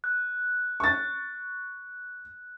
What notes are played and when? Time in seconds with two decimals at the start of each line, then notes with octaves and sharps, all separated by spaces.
0.04 F#6
0.80 C#6 A6